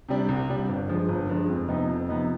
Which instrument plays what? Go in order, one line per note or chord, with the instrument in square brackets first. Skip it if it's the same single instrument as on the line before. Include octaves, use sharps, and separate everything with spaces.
[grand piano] C3 G3 D4
C2
C3 G3 D4
G1
G2 F3 G#3
G1
G2 F3 G#3
F2
C3 F3 B3 D#4
F2
C3 F3 B3 D#4